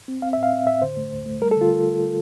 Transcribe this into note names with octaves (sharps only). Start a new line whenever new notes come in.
C4
C4 F5
E5
A2
F5
C4
A2 E5
D3 C5
A3
D2
A3
G3 A#4
A4
D3 F4